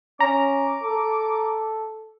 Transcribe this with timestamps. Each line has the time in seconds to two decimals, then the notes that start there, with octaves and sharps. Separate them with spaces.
0.20 C#4 A#5 D6
0.84 A4